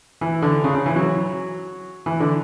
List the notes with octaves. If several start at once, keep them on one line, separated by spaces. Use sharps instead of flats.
E3
D3
C#3
C#3
E3
F#3
E3
D3